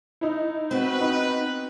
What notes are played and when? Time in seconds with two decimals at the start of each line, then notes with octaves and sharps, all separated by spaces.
0.21 D#4 E4
0.71 B3 C4 F#4 B4
1.01 D#4